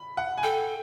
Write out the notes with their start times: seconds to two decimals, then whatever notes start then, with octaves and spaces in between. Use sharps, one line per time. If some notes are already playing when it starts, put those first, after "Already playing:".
Already playing: B5
0.17 F#5
0.38 G#5
0.43 A4 G5